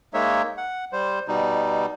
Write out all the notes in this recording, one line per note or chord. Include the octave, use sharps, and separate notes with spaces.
G#3 A#3 D#4 C#5 E5
F#5
G3 C5
B2 G3 D#4